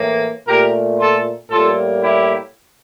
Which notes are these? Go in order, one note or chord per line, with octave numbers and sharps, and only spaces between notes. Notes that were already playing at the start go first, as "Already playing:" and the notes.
Already playing: A2 E3 A#3
A#2 A3 G4 A#4
F4 A4
A2 G3 A#3 F4 A4
E4 G4